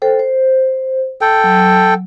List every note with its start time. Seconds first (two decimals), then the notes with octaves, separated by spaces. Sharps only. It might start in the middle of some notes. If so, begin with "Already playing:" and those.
0.02 A4 C5 G5
0.19 C5
1.21 A4 G5
1.44 F#3